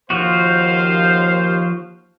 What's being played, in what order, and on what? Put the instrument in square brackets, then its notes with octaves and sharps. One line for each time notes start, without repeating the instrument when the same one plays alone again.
[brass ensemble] D#2 C5 F5 [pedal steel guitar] F3 F4 F#4